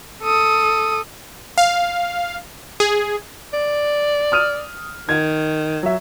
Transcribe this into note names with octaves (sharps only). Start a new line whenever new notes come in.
A4 D#6
F5
G#4
D5
D#6 F6 D#7
D#3 G#6
F#3 E5